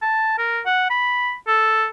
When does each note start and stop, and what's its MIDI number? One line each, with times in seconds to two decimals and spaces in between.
0.02 0.37 81
0.38 0.61 70
0.66 0.86 78
0.90 1.35 83
1.48 1.86 69